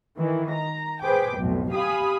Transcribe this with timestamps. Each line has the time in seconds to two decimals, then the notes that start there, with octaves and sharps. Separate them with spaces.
0.17 D#3 E3
0.53 A#5
1.03 G#4 B4 C5 G5 D6
1.39 B1 F2 A2
1.71 G4 F5 G#5 B5 D#6